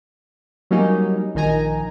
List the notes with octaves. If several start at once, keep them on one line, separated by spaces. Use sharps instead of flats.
F#3 G3 A#3 C#4 D#4
A#1 D#3 D#4 G#5 A#5